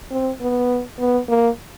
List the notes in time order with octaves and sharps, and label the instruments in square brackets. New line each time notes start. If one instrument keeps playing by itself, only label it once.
[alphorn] C4
B3
B3
A#3